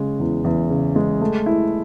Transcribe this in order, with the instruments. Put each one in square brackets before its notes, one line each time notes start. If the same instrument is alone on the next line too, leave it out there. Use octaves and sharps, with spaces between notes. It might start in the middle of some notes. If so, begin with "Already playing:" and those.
Already playing: [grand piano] C#3 G#3
E2
E2
C#3
G#3
A3
E4